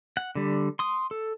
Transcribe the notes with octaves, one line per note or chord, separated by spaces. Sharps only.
F#5
D3 G3
C6 D#6
A4